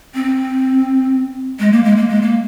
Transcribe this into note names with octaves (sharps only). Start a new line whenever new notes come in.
C4
G#3
A#3
G#3
A#3
G#3
A#3